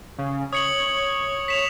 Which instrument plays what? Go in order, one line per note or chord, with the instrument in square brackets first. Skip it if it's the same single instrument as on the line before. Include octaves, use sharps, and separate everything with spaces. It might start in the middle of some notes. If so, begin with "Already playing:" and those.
[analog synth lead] C#3
[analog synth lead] C#5 [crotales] D#6 C#7 F#7
[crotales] B6 E7 F7